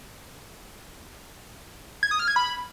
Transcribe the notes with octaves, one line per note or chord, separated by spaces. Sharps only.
G#6
D#6
F6
G#6
B5